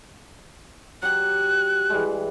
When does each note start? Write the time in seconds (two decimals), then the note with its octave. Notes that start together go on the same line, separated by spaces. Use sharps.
1.03 F#3 G4 F#6
1.90 E3 G3 G#3